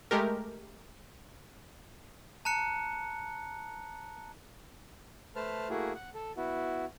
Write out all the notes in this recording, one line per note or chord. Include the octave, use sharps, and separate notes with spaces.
G#3 A3 G4 A#4
A5 A#5 F#6 C#7
A3 B4 C5 A5 F6
A3 A#3 E4 F#4 G#4
F#5
A4
B3 E4 F#4